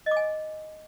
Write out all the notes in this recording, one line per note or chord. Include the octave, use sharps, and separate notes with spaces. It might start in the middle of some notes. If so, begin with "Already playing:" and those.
D#5
D6
G#5